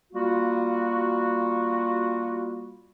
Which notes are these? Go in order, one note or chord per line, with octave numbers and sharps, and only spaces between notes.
G3 A#3 F4 F#4